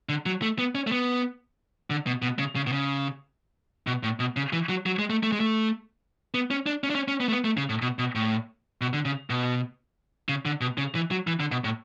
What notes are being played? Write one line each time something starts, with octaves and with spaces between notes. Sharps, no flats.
D3
F#3
A3
B3
C#4
A3
B3
D3
B2
B2
C#3
C#3
B2
C#3
B2
A2
B2
C#3
E3
F#3
F#3
G#3
A3
A3
G#3
A3
B3
C#4
D4
C#4
D4
C#4
C#4
B3
A3
B3
A3
C#3
A2
B2
B2
A2
B2
D3
C#3
B2
C#3
D3
B2
C#3
E3
F#3
E3
D3
B2
A2